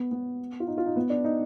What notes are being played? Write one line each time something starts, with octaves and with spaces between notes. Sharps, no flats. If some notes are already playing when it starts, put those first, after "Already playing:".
Already playing: B3
B3
F4
D#4
F4
D#4
B3
D4
D#4